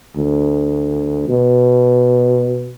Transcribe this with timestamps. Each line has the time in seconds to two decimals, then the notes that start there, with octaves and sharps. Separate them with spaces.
0.16 D2
1.29 B2